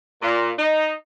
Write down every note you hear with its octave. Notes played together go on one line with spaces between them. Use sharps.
A#2
D#4